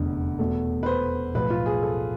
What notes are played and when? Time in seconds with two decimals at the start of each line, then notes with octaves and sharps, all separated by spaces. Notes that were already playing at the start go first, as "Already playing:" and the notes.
Already playing: F1 E2 D3
0.39 E2 B2 A3
0.83 B4
0.86 C5
1.35 B1 A2 F3 B4
1.50 F4
1.66 G#4
1.82 A4